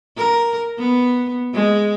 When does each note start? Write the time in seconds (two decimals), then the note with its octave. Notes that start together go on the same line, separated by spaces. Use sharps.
0.17 A#4
0.78 B3
1.53 G#3